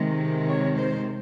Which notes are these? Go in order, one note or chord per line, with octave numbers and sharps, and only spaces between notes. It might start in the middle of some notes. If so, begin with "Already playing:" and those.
Already playing: C3 D#3 G#3
C#5
C5